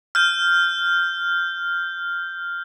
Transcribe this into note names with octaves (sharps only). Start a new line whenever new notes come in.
F6 G6